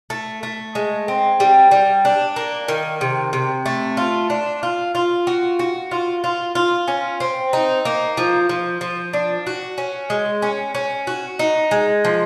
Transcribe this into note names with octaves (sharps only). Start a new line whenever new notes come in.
A3
A3
G#3
C4
G3
G3
D4
A#3
D#3
C3
C3
A3
F4
D4
F4
F4
F#4
F#4
F4
F4
F4
C#4
C4
D#4
A#3
F3
F3
F3
D4
F#4
C#4
G#3
C#4
C#4
F#4
D#4
G#3
F3